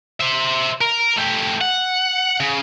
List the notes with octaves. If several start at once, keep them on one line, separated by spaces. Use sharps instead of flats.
C5 E5
A#4
A3 G4
F#5
C#3